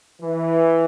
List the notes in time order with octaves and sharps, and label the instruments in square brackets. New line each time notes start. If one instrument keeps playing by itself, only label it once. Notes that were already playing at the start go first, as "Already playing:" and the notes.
[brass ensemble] E3